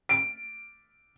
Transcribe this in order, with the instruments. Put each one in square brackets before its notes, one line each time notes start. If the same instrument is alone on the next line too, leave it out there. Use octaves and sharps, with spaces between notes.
[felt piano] D7